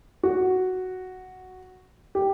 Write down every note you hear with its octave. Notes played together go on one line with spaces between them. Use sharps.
F#4
G4